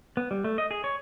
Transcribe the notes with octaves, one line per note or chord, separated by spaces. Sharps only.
B3
G3
A3
D#5
G#4
C#5